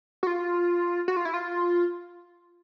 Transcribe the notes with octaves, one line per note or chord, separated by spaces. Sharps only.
F#4
F4
F#4
F4
E4
F4